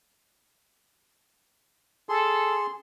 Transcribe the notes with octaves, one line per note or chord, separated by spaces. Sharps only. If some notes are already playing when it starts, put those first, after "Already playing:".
G#4 A4 C6